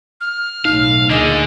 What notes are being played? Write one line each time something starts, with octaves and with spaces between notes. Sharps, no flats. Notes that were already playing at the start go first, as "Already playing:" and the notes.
F6
B1 A2 D#4 F5
D2 A#2 D3 G#4 D#5